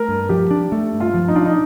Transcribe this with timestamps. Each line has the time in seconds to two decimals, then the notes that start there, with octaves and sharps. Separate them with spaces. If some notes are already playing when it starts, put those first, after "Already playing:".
Already playing: A3 A#4
0.08 G2
0.29 F3 G4
0.51 D4
0.72 A3
0.93 G2
1.00 F4
1.14 F3
1.28 D#4
1.36 D4 F4
1.45 D#4